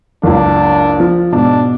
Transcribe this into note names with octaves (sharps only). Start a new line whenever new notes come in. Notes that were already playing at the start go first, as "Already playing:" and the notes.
F#1 C#2 D4
F3
G#2 B2 D4